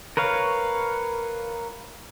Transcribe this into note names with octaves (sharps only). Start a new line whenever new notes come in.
A#4 B4 C#5 F5